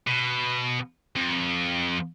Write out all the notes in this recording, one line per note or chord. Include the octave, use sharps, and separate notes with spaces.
B2
F2